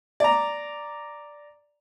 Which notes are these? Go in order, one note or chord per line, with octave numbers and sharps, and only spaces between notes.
D5 A#5